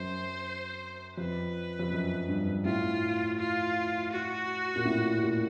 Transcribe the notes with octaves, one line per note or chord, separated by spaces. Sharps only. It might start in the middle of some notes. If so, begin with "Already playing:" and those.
Already playing: F#2 C5
F2 B4
F2
F#2
G2
A2 F4
F4
F#4
A#2
A2
A#2